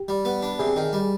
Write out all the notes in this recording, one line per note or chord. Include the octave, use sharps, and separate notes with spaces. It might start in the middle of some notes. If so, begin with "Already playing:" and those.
Already playing: G4
G3
B3
D4
C3 G#4
D#3
G3